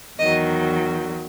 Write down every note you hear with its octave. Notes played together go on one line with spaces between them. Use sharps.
E2 D#3 F#3 D#5